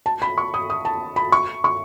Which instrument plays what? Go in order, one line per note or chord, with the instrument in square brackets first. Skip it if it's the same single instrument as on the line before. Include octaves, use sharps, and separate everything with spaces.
[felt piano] A5
B5
C#6
D#6
D#6
A5
B5
C#6
C#6